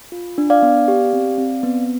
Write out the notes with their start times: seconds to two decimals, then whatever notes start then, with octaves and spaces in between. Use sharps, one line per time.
0.12 F4
0.38 D4
0.50 D5 F5
0.62 B3
0.88 G4
1.13 C4
1.38 C4
1.63 B3